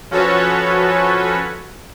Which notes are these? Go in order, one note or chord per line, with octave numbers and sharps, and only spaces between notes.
F3 C#4 F#4 A4 B4 C#5